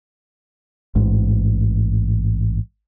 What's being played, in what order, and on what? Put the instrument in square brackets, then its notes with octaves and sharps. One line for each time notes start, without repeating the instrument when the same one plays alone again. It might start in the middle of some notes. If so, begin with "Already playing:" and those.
[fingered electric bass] A1 G#2